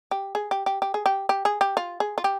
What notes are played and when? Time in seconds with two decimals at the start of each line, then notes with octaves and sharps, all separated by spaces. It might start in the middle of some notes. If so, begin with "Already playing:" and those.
0.11 G4
0.35 G#4
0.51 G4
0.66 G4
0.82 G4
0.94 G#4
1.06 G4
1.29 G4
1.45 G#4
1.61 G4
1.77 F4
2.00 G#4
2.18 F4
2.24 G4